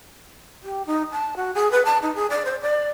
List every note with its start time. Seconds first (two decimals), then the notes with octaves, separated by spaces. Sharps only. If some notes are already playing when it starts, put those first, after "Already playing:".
0.63 G4
0.86 D#4
1.12 A5
1.36 F#4
1.55 G#4
1.71 B4
1.85 A5
2.02 D#4
2.15 G#4
2.30 D5
2.45 C5
2.61 D5